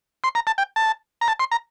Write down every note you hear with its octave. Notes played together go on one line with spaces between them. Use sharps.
C6
A#5
A5
G5
A5
A#5
A5
C6
A#5